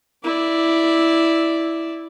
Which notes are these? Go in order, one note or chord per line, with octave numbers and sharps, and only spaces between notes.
E4 D5